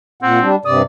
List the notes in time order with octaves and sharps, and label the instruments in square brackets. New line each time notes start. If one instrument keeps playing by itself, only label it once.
[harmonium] A#2 F#5 [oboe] C4
[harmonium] G3 D4
[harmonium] G2 C3 D5 [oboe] D#6